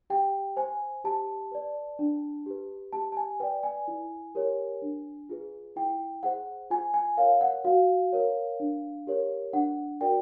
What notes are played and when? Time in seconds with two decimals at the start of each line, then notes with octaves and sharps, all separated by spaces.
0.10 G4 G5
0.57 C5 G#5
1.04 G4 A5
1.52 B4 D5
1.99 D4
2.46 G4 B4
2.93 G4 A5
3.12 A5
3.17 G#5
3.40 B4 D5 G5
3.63 G#5
3.88 E4
4.35 G4 A#4 C#5
4.82 D4
5.29 F4 G#4 B4
5.76 E4 G5
6.23 G#4 C5 F#5
6.71 F4 G#5
6.94 G#5
7.17 A#4 C#5 F5
7.41 F#5
7.65 F#4 F5
8.13 A#4 C#5
8.60 D4
9.07 G4 A#4 C#5
9.53 D4 F#5
10.01 F#4 A#4 D5 G5